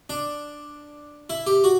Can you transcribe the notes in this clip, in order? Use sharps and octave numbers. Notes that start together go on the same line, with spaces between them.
D4
E4
G4
F#4